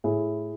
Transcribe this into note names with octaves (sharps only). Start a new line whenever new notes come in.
A2 E4 G#4